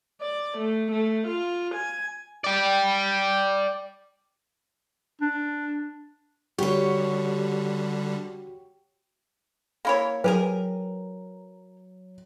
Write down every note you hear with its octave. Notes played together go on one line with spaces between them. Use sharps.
D5
A3
A3
F4
G#5
D5 G5
D4
D3 G3 F#4 G4 C#5
A#3 E4 C#5
F#3 G4 G#4 A#4 B4